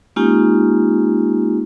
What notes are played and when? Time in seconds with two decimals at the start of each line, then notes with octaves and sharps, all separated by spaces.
0.16 G#3 A#3 C#4 D#4 F4 G4